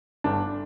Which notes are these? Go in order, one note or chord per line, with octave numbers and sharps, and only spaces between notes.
G1 D4